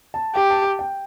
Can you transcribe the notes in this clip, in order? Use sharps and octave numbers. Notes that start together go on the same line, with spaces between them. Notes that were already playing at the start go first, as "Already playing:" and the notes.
A5
G4 G5
A5
A5
G5